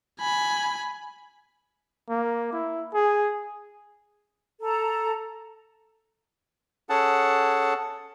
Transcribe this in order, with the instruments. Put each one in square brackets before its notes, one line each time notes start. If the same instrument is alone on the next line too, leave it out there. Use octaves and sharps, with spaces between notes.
[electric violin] G#5 B5
[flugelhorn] A#3
E4
G#4
[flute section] A4 A#5
[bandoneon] C#4 G#4 A4 F#5 A5